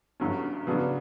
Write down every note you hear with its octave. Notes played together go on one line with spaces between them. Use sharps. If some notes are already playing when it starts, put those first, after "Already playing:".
G1 G2 F#3 C#4
C#3 F#3 B3 D4 F#4